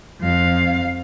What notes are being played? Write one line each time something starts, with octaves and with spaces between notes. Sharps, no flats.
F2 F5